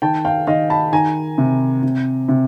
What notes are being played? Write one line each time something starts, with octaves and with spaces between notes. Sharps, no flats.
D#3 G5 A5
F5 G5
D#3 D#5 F5
A5 B5
D#3 G#5 A#5
C3
C3
C3